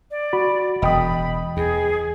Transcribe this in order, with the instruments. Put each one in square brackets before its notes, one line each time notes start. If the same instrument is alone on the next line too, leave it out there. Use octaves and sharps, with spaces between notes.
[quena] D5
[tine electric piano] F#4 B5
[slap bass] E1 [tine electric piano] D#5 G5 D#6 [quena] B5
[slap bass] E2 [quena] G#4